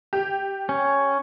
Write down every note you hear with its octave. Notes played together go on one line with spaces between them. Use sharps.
G4
C#4